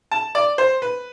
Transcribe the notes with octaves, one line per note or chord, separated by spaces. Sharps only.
A5
D5
C5
B4